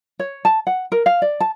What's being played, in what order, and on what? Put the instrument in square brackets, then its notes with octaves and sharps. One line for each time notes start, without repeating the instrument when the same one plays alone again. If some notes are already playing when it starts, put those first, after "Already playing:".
[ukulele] C#5
A5
F#5
A#4
F5
D5
A5